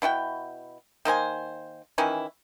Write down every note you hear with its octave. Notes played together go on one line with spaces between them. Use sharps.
B2 E4 F#4 G5
D#3 A#3 C5 G#5
D#3 E3 C#4 E4